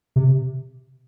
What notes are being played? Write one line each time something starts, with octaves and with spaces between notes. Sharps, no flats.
C3